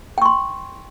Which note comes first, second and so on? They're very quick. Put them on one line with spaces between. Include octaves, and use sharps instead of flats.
G5 C#6 C6